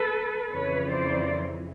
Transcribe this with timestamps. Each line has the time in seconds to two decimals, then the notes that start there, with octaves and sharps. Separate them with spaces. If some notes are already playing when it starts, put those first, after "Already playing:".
Already playing: A4 B4
0.51 F2 C#3 E3 B4 C#5
0.90 C5 D5